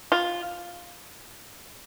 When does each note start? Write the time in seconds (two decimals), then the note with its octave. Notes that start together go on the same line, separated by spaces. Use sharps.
0.12 F4